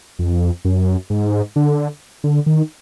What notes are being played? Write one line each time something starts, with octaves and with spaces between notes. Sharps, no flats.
F2
F#2
G#2
D3
D3
D#3